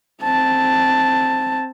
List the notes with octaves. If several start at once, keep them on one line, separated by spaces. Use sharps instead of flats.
C4 A5